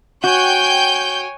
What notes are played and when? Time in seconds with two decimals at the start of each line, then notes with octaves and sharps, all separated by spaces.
0.24 F#4 C#5 G5 G#5 G6